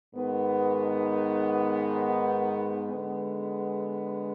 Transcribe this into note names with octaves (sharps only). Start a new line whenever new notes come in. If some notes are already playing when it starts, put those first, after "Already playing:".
G#2 D#3 B3
D3 G#3 B3